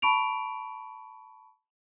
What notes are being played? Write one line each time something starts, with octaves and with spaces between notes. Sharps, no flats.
A5 B5 C#6 D7 F7